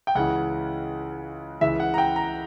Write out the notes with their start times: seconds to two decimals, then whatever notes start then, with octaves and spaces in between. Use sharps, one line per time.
0.07 G5
0.15 C#2 C#3 E3 F#5
1.61 C#2 C#3 E3 E5
1.80 F#5
1.94 A#5
1.98 G5
2.16 A#5